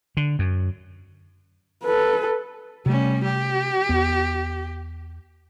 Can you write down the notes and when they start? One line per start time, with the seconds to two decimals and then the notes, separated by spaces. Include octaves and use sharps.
0.17 D3
0.39 F#2
1.84 A4 B4
2.86 C3 G3 A3 C#4
3.24 G4
3.89 E2 B3